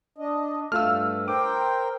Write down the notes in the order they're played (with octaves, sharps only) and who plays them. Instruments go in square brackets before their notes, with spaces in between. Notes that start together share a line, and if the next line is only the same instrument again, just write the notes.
[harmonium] D4 D#5
[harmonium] G2 [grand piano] A3 F4 [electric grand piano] E6 F6
[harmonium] A#4 C5 G5 [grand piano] D6